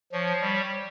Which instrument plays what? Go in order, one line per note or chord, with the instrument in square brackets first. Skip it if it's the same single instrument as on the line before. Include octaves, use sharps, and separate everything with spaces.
[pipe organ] F3 [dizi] C#5
[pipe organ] G3